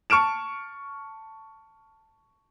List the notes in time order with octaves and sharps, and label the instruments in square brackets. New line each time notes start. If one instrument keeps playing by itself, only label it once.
[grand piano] A5 C#6 F6 D7 E7